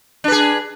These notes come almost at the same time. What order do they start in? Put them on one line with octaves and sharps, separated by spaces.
D4 B4 G#4